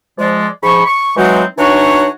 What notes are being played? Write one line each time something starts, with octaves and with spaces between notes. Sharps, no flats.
F3 G#3 D5
G#2 F3 B5 C#6
C#6
E3 F#3 G#3 C4 D#4 F#4
E3 D4 D#4 F#4 C#5